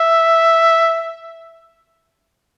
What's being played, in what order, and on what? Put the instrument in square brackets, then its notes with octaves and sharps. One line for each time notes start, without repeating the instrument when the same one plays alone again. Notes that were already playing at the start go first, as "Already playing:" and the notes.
Already playing: [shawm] E5